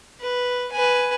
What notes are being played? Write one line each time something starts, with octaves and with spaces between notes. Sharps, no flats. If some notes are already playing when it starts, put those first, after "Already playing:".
B4
B4 G#5